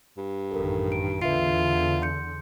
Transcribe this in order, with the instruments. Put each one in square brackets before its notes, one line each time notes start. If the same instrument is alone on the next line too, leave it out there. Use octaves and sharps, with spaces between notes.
[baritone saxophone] G2
[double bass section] A1 F#2 D#3 [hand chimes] A4 A#4
[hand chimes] D7
[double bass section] E2 D3 [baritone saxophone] F4 [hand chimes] B4 E5 C7
[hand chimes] C6 G6 C#7